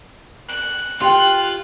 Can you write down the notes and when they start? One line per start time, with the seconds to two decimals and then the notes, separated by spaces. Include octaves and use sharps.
0.49 F#6
1.02 F4 G4 G5 F#6